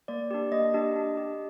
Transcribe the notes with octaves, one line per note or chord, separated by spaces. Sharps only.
A#3 D5
D4 G4
A#3 D#5
D4 G4
D4
G4